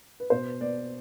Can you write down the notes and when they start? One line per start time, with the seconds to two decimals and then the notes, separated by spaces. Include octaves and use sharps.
0.20 B4
0.30 B2 C5
0.60 B3 D5